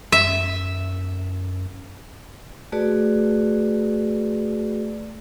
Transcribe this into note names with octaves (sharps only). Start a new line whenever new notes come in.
F#2 E5
A3 F#4 G#4 B4 D5